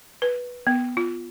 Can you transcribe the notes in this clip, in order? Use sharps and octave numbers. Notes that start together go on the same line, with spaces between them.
B4
B3
F4